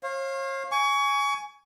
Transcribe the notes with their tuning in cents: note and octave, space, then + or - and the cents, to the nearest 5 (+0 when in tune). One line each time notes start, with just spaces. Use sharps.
C#5 -45 F5 +0
G#5 +0 C#6 +30